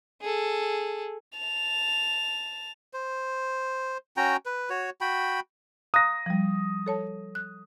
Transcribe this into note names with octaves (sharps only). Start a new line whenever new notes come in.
G#4 A4
A5 F7
C5
C#4 F#4 G5 A#5
B4
F#4 C#5
F#4 G5 B5
F5 A#5 D#6 F#6 A#6
F3 G3
A4 C#5 A5
F#6